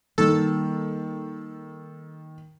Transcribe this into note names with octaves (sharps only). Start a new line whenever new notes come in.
D#3 G3 A#3 A4